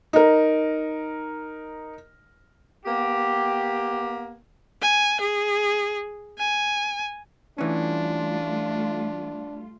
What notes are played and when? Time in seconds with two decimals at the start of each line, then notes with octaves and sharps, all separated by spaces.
0.13 D#4 A#4
2.85 A#3 B3 G4
4.81 G#5
5.20 G#4
6.38 G#5
7.58 E3 G3 A3 C#4 D4 F4